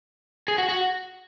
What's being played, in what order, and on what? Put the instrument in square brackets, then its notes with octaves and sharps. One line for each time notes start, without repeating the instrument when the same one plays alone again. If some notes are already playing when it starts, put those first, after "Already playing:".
[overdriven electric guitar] G#4
F#4
F#4